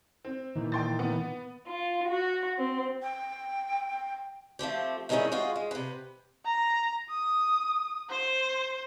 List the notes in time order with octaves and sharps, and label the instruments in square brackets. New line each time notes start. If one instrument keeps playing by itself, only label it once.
[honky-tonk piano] C4
[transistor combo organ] A#2 D#3 E3
[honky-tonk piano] G5 C6 A6
B3
[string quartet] F4
F#4
C4
[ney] G5
[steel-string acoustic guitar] F3 A3 C4 G4
G2 D#3 G#3 C#4 D#4 E4
G#3 F4 F#4 G#4
G#3
C3 B4
[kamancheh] A#5
D#6
C5